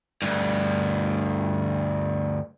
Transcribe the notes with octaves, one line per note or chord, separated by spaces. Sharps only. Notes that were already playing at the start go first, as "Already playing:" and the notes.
D2 G2